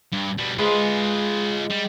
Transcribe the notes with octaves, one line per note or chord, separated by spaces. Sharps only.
G2
B2 G3
G#3 F4 B4
G3